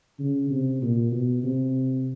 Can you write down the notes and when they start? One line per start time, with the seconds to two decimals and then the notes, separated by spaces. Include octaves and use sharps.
0.19 C#3
0.50 C3
0.82 A#2
1.12 B2
1.44 C3